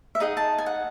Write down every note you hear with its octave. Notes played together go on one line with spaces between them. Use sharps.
E5
D#4 G#4 D#5 F#5
A5
G#5
F#5